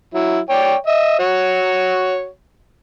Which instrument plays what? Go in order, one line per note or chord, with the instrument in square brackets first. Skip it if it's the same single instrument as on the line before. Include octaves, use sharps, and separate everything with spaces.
[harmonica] F#3 E4
C#5 D5 G5
D#5 E5
F#4 C#5